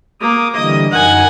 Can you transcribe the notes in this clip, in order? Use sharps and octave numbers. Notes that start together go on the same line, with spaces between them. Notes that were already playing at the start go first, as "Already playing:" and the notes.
A#3 D6 D#6
D3 E3 G3 D#5
F#2 D#4 A#4 F#5 G#5